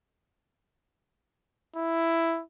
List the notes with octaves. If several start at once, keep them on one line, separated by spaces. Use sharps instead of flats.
E4